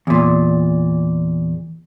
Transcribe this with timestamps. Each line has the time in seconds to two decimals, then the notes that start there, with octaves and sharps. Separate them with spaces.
0.07 E2 A#2